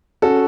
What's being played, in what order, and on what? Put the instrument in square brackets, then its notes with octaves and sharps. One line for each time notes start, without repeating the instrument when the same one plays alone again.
[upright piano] C#4 F#4 A4